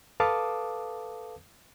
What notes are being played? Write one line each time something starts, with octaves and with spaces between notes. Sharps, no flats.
A4 B4 F5 A5 D6 D#6